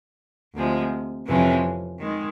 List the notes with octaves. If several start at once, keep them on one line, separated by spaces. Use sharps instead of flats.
D2 C3 F3 G#3
F2 C3 E3 G#3 C#4
D#3 G#3